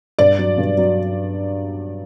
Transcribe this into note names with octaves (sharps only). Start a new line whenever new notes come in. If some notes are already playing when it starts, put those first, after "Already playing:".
G2 D5
F#3
G2
F#3